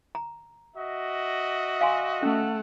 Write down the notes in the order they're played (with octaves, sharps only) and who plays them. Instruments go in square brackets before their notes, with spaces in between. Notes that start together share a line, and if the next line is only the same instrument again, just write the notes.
[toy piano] A#5
[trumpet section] F#4 D#5 E5
[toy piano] F5 G#5 C6
[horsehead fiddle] A3 F#5 [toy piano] C#4